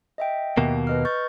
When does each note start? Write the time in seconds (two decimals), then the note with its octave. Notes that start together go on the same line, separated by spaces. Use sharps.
0.18 D#5 E5 G5
0.57 D#2 B2 A#3
0.87 B4 D#5 F6
1.05 C#6 G6 A6